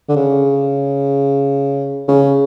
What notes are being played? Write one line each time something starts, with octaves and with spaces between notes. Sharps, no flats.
D3
C#3
C#3